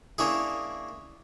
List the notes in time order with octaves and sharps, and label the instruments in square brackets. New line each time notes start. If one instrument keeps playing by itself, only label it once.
[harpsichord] A#3 C#4 D4 E4 G#4